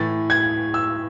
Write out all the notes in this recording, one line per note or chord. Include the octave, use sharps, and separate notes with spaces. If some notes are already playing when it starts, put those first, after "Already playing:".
Already playing: A2 E3 A6
G#6
E6